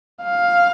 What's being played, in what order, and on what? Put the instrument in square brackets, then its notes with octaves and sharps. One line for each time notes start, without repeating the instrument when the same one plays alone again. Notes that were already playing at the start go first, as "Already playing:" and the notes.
[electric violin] F5